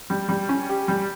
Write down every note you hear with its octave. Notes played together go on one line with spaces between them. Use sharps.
G3
G3
C#4
G4
G3